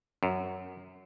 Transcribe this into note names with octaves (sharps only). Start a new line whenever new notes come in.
F#2